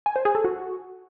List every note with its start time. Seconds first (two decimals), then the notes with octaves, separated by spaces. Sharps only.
0.06 G#5
0.16 C5
0.25 G#4
0.35 A4
0.45 F#4